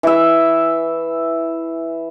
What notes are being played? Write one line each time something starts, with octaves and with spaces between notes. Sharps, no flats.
E3 E5